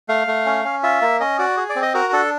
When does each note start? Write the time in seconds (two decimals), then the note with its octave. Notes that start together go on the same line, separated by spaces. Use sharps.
0.09 A3 F5
0.27 A3
0.46 C#4
0.65 C#4
0.83 F4 E5
1.02 A#3
1.20 C#4 D#5
1.39 F#4 D5
1.57 G#4
1.69 D5
1.76 C4
1.82 D#5
1.94 F#4 A#4
2.13 D4 A4